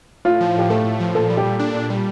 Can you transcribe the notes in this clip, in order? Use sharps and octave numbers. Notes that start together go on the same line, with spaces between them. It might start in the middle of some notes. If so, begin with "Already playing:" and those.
A2 F4
F3
A2 G4
A3 A4
A2
F3
A#2 A4
G3
G4
A#2
D4
A#2
G3